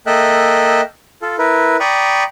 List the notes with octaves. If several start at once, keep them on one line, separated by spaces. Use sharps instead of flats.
A#3 A4 D#5 E5 G5 F#6
F4 A4
E4 A#4 B4
D5 G5 A#5 B5 C#6 D#6